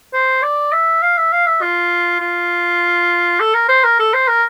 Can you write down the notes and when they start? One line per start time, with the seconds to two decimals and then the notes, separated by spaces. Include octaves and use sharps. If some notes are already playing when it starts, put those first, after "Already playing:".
0.14 C5
0.42 D5
0.72 E5
1.02 F5
1.17 E5
1.32 F5
1.47 E5
1.61 F4
2.20 F4
3.40 A4
3.54 A#4
3.69 C5
3.84 A#4
3.99 A4
4.13 C5
4.28 A#4